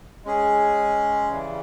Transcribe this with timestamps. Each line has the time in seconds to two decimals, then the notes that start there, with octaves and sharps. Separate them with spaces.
0.25 G#3 C#4 G#4
1.28 C#3 E3 G3